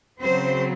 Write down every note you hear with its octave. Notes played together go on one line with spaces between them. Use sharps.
C#3 F#3 C4 C5